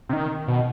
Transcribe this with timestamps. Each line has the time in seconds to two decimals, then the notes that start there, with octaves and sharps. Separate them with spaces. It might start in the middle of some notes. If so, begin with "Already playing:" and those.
0.09 C3
0.13 D#3
0.48 B2